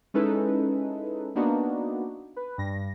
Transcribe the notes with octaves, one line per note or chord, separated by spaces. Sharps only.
G#3 C#4 D#4 E4 A4 B4
A#3 B3 D4 D#4 F#4
B4
G2 A#6